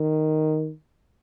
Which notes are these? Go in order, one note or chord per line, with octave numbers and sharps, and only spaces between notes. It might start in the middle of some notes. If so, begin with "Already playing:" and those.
Already playing: D#3